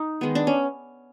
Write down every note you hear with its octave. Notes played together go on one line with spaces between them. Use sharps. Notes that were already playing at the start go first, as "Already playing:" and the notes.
Already playing: D#4
D#3 G#3 B3
D4
C#4